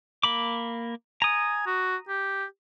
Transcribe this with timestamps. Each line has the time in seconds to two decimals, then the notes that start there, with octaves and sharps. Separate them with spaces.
0.23 A#3 B5 D6
1.22 G#5 A#5 D#6
1.66 F#4
2.09 G4